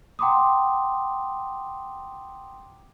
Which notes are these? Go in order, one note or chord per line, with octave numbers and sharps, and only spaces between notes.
F#5 G5 A#5 C6 D6 D#6